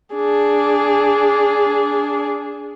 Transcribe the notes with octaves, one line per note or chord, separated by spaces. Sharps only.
D4 G#4